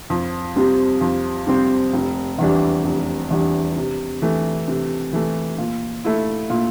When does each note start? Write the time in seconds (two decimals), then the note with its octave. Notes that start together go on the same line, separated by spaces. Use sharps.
0.10 F2
0.56 C3 G3 C4
1.01 F2
1.47 C3 G3 C4
1.93 F1
2.38 E2 E3 G3 D4
2.84 F1
3.30 E2 E3 G3 D4
3.76 C3
4.22 E3 A3
4.68 C3
5.13 E3 A3
5.58 A#2
6.04 A3 E4
6.50 A#2